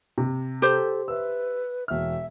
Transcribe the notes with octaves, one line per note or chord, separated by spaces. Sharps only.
C3
G4 A4 C5
B4 E5 E6
E1 E5 F6